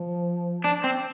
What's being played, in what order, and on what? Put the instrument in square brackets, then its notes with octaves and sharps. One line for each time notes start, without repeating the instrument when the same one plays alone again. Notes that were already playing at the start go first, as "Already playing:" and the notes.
Already playing: [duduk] F3
[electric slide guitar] D4
C4